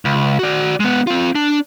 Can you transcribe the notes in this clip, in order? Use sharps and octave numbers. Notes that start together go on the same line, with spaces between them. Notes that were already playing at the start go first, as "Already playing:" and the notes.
C#2
F#4 D5
G#3 B3
C4 F4
D4